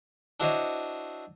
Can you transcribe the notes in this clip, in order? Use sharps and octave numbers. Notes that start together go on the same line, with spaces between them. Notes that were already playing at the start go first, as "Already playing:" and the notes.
D4 E4 F#4 C5 C#5 D#5